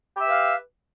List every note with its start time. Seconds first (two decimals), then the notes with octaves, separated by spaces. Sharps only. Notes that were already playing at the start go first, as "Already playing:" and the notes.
0.17 G4
0.21 E5
0.25 B4
0.29 F5